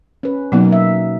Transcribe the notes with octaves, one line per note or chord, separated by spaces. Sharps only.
C#4 B4
B2 F#3 A#3 B3 D#4
E5